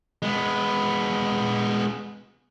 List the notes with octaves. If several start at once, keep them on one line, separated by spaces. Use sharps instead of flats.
G#3 B3